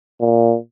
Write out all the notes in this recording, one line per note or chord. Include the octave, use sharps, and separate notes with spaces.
A#2